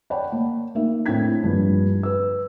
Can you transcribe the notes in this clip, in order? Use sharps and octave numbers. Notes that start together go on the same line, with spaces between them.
C#5 D5 F#5 G5 A5 B5
A#3
A#3 D#4 A#4 E5
A2 C4 D4 G5 G#6 B6
A#1 G2
B4 E6